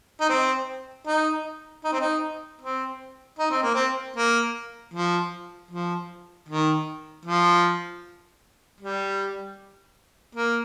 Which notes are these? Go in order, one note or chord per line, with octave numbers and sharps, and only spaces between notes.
D#4
C4
D#4
D#4
C4
D#4
C4
D#4
C4
A#3
C4
A#3
F3
F3
D#3
F3
G3
A#3